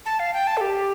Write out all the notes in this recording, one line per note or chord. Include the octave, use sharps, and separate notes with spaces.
A5
F5
G5
A5
A4
G4